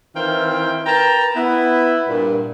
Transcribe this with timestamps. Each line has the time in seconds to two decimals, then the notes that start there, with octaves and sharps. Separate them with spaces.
0.15 D#3 E3 C4 E4 F4 G5
0.85 A#4 B4 G5 A5 A#5
1.36 B3 E4
2.08 G2 A#2